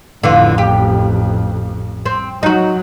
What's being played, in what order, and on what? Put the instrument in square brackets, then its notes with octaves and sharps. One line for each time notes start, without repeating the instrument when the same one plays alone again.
[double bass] A1 F2 [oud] D3 E3 F4
[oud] G4
C4
[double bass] F#3 [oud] D#4 F#4